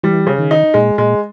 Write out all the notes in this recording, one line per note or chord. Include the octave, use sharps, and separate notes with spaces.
E3 G3
C#3
D#3
D#4
A#2 G#3
A#2 G#3